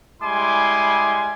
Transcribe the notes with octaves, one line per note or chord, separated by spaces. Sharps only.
G3 G#3 E4 G#5 C6 D6